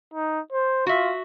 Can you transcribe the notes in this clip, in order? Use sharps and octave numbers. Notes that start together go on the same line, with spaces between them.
D#4
C5
F4 F#4 E5